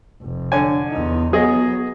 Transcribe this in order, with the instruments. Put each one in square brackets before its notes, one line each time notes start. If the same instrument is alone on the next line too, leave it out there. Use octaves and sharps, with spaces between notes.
[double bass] F1
[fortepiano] D3 C#5 G#5
[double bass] E2 D#4
[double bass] F#3 B3 [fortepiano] G#4 D#5